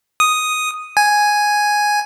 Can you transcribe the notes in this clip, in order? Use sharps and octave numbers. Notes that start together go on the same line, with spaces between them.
D#6
G#5